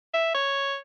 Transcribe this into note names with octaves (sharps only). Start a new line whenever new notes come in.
E5
C#5